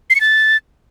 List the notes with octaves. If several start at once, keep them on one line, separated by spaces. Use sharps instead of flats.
C7
C#7
A6